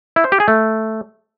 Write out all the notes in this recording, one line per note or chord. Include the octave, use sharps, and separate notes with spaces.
E4
C5
G4
G#4
A3